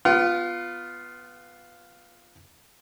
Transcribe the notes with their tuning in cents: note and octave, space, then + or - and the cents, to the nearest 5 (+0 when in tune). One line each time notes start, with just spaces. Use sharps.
B3 +0 F4 +0 F#5 +40